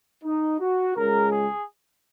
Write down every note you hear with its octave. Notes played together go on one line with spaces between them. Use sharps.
D#4
F#4
C#2 C#3 G#3 A#4
G#4